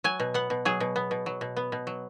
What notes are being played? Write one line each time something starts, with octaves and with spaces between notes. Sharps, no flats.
F#3 G#5
B2
B3 F#5
B2
F#3 G#4
B2
B3
B2
F#3
B2
B3
B2
F#3